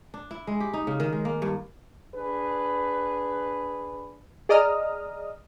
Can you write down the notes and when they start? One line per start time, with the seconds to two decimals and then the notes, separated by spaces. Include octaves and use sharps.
0.14 D4
0.31 E4
0.47 G#3
0.60 G4
0.73 D#4
0.87 C#3
1.00 D#3
1.13 G#3
1.25 A#3
1.42 G2
2.15 D4 G#4 B4
4.49 G#4 D5 D#5 A#5 D#6 F6